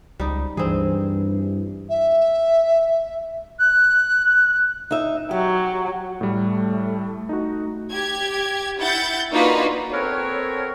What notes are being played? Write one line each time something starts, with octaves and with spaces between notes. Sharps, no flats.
C#2 G3 D#4
G2 E3 C4 G#4
E5
F#6
D#4 E5
F#3 G4
A2 G3 A3
D#4 F#4
G4 G#6
E4 F#5 G6 A6
A#3 D4 D#4 F4 F#4 B4
B3 C4 A4 A#4 C#5